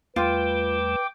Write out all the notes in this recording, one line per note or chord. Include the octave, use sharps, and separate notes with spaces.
E2 G3 A3 F4 B4 G5 D6